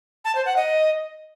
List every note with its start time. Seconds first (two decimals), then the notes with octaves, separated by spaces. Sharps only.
0.25 A5
0.35 C5
0.46 F#5
0.56 D#5